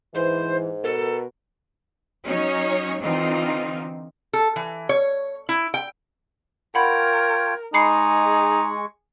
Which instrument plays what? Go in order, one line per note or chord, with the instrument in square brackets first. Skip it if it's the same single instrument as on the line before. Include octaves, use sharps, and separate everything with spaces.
[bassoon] G#2 [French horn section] E3 [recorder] C5
[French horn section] B2 A#4 [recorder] A4
[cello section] F#3 C#4 D#4 C#5
D3 E3 C4 D#4 F4
[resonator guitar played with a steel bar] A4
E3
C#5
E4
G5
[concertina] F4 C#5 G5 [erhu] A#4 [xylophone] F#5 B5
[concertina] G#3 C#6 [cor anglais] D#4 [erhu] G#4 [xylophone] B5 C7 C#7